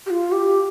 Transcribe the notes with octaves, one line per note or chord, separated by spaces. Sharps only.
G4
F4
G4